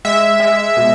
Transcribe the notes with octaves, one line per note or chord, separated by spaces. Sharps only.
G#3 E5
G#3
B2